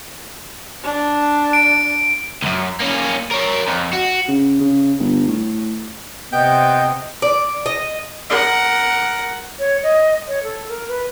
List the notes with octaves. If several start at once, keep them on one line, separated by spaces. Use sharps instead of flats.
D4
D7
C#2 F#2
A#3 C#4
A#4 C#5
F2
F#4
C#3
C#3
G1
A2
C3 B3 D#5 G5
D5
D#5
A#4 F#5
C#5
D#5
C#5
A4
A#4
B4